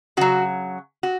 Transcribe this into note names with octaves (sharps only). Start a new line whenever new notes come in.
C#3 F#3 F#4
F#4